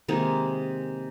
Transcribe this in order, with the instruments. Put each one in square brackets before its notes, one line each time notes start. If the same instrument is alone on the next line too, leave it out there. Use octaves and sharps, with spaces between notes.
[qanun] C3 D#3 G#3 A#3